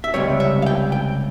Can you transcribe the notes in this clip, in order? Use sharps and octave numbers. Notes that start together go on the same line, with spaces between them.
E5
C#2 C3 G3 C#5
E5
F5
G5
G5